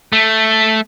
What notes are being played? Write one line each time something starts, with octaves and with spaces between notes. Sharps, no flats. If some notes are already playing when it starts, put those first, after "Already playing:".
A3